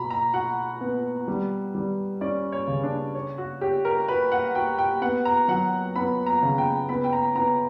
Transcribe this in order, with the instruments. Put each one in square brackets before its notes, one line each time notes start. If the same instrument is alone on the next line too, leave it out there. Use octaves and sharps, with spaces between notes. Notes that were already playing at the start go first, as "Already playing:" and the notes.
Already playing: [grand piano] B2 F#4 [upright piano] A#5 B5
[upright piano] A#5
[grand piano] F#4 [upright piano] F#5
[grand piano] B3
G3
G3
[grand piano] C#4 [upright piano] D5
[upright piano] C#5
[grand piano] C#3
[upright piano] D4
[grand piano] C#5
[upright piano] F#4
[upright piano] G4 [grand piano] C#5
[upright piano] A#4
[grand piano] F#4 [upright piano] B4
[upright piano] F#5
[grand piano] F#4 [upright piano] G5
[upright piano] G5
[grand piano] B3 [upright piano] F#5
[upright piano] A#5
[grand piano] F#3 [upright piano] F#5
[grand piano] B3 [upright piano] B5
[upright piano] A#5
[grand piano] C#3
[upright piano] G5
[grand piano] B3 [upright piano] B5
[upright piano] G5
A#5
[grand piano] B3 [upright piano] A#5